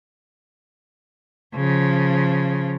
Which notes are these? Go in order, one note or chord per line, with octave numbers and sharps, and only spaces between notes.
C#3 F3